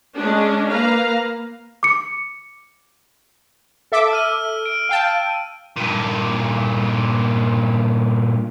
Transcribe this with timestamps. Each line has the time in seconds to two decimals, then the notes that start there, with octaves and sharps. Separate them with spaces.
0.15 G#3 C#4 D4
0.69 A#3 B4 F5 A#5
1.83 D6 C#7
3.92 A4 E5 D6
4.12 E6 F6 D#7
4.66 D7
4.89 F5 G5 A5
5.77 G2 A#2